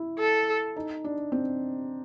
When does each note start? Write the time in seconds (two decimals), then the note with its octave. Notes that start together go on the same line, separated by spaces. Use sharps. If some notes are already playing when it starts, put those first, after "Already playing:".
Already playing: E4
0.19 A4
0.76 D#4
1.04 D4
1.32 C4